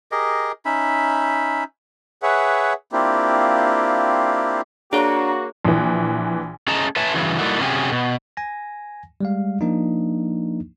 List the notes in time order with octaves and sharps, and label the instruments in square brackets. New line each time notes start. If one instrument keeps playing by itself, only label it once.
[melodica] G4 G#4 A#4 D#5
C#4 D#4 E5 B5
[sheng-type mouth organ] G#4 B4 C#5 E5 F#5
A#3 C4 D4 E4 F4 G4
[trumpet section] A#3 F#4 [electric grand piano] D4 [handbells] G#4 C#5 [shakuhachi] A#5
[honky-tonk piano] A#1 E3
[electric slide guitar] A3 C#4 G#4 D#5 A5 A#5
B4 C#5 E5 G#5 A5
G2 C#3 E3 F#3 C#4
G3 A3 A#3 D#4 E4 F#4
C3 F#3 C#4 G4 G#4
B2
[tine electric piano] G#5 A#6
G3 G#3 F5
F3 A#3 D4 D#4